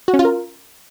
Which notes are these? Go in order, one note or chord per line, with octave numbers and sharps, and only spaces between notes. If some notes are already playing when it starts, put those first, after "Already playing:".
F#4
C#4
F4
A#4